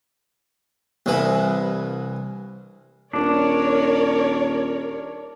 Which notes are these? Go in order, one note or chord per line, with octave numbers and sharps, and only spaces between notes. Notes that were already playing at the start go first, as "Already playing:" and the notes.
C2 G2 E3 B4
D#1 D4 A#4 C#5 D5